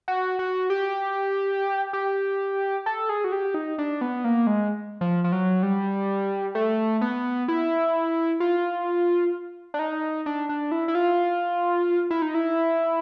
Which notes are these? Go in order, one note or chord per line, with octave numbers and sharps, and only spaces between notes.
F#4
F#4
G4
G4
A4
G#4
F#4
G4
D#4
D4
B3
A#3
G#3
F3
F3
F#3
G3
A3
B3
E4
F4
D4
D#4
D4
D4
E4
E4
F4
E4
D#4
E4